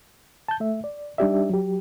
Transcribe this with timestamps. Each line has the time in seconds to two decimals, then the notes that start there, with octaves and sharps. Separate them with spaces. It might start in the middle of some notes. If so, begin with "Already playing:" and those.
0.48 A5 G6
0.60 A3 E5
0.84 D5
1.18 G3 D4 D#4 G4 D5 E5
1.50 F#3 G4